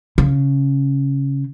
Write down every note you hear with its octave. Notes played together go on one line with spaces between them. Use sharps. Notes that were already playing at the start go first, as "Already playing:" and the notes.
C#3